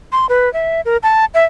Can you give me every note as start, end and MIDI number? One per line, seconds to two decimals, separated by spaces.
0.12 0.26 84
0.29 0.52 71
0.53 0.81 76
0.85 0.97 70
1.03 1.25 81
1.34 1.45 76